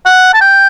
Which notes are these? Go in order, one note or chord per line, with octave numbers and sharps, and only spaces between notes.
F#5
A5
G5